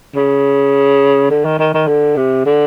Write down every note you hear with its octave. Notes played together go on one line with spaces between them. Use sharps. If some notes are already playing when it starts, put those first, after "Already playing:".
C#3
D3
D#3
D#3
D#3
D3
C3
D3